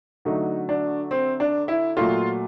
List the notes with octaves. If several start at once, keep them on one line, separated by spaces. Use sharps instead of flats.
D3 F#3 A3 D#4
D4
C4
D4
E4
A#2 F#3 A3 F4